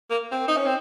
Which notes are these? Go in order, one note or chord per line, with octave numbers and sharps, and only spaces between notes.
A#3
C4
D#4
C#4
C4